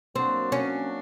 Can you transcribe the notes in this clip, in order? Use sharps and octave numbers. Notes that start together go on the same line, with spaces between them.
F#3 A#3 C4 D4 F#4 A#4
C#4